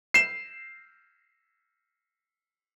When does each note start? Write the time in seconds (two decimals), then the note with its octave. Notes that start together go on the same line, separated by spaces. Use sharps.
0.14 C7 E7